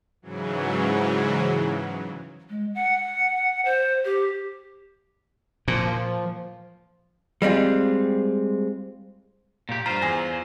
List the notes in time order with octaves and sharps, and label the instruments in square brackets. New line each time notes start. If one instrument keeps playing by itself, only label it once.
[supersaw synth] G#2 C#3 E3 F#3
[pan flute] G#3
F#5
C5
G4
[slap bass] A#2 [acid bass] F3
[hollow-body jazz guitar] G3 G#3 C4 F4
[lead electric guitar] A#2 G4
[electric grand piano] G2 A#5 [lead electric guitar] F4 C5
[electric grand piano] E2 G#5 A#6